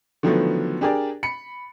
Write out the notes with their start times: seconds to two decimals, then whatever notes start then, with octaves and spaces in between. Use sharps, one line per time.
0.23 D3 D#3 F3 F#3 A3 B3
0.81 D4 G4 G#4 A#4 D5
1.23 B5 C#7